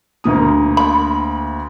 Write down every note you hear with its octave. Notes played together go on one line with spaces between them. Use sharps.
D2 A#3 D#6
B5